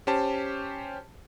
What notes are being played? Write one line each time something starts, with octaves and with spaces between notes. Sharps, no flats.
C#4 G4 C5 A5